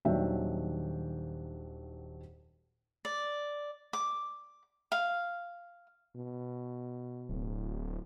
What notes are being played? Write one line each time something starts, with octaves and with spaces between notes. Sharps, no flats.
D#1 D#3 F#3 D4 E5 G5
D5
D6
F5
B2
D1